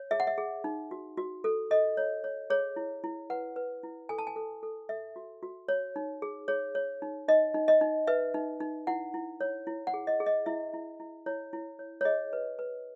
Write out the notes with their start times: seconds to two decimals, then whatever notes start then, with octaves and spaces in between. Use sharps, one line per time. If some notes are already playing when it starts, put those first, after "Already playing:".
Already playing: C#5
0.11 G#4 E5
0.20 F#5
0.27 E5
0.38 G#4
0.64 D#4
0.91 F#4
1.17 F#4
1.44 A4
1.71 A4 D#5
1.97 C#5
2.24 C#5
2.50 G#4 C#5
2.76 E4
3.04 E4
3.30 B4 F#5
3.56 B4
3.83 E4
4.09 A4 G#5
4.18 A5
4.27 G#5
4.36 A4
4.63 A4
4.89 A4 E5
5.16 F#4
5.43 F#4
5.68 C#5
5.96 D#4
6.22 G#4
6.48 G#4 C#5
6.75 C#5
7.02 D#4
7.28 D#4 D#5
7.54 D#4
7.68 D#5
7.81 D#4
8.07 B4 E5
8.34 D#4
8.60 D#4
8.87 E4 F#5
9.14 E4
9.41 C#5
9.67 E4
9.87 F#5
9.94 G#4
10.07 D#5
10.20 G#4
10.26 D#5
10.46 E4 E5
10.73 E4
11.00 E4
11.26 E4 C#5
11.53 E4
11.79 C#5
12.01 C#5
12.05 G#4 D#5
12.33 B4
12.59 B4